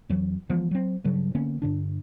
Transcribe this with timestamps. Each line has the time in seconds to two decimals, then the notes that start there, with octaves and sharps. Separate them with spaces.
0.09 F2 E3 F#3
0.50 E3 F3 G#3 B3
0.71 F#3 C4
1.04 G2 C#3 F#3
1.35 D3 A#3 B3 C#4
1.62 G2 D3 D4